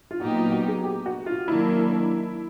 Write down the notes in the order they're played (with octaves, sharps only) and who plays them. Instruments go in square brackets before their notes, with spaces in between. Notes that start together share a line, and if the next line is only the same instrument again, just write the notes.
[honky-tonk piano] F4
[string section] A#2 F#3 B3 D#4 G4 [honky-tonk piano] F#4
[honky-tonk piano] F4
F#4
G#4
G4
F#4
F4
[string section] D#3 F#3 A#3 D4 [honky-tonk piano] E4